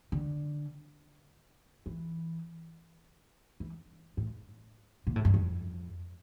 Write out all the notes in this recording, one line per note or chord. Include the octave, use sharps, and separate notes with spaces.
D3
E3
E3
A2
A#2
A2
G2
F2